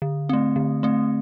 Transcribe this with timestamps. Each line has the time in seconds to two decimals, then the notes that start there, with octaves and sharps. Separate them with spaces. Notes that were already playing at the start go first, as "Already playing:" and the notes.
0.02 D3
0.29 A3 C4
0.56 D3
0.83 A3 C4